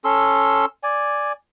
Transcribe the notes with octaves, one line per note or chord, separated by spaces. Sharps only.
C#4 A4 C6 E6
D5 G#5